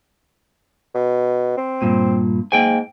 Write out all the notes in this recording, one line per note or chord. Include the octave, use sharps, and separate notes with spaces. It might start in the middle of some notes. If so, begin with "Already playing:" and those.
B2
C4
G2 A#2
G#2 A#3 G5 G#5